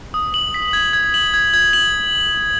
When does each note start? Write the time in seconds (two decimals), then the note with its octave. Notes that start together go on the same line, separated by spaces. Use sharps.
0.14 D#6
0.34 F#7
0.54 B6
0.73 G#6
0.93 G#6
1.14 F#7
1.34 G#6
1.54 G#6
1.73 F#7